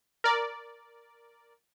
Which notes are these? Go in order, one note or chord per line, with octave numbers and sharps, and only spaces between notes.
A#4 D5